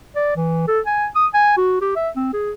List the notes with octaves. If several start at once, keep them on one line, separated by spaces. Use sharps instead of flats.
D5
E3
A4
G#5
D#6
G#5
F#4
G4
E5
C4
G#4